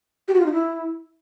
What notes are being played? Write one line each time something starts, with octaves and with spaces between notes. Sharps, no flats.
G4
F#4
F4
D#4
E4